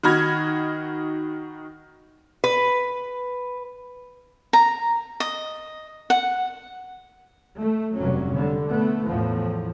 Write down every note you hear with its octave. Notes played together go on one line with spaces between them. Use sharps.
D#3 F#4 D#5 B5 F6 G#6
B4
A#5
D#5
F#5
A3
F1 G2 F#3 C#4
D3 G3
A3 B3
E2 A2 F3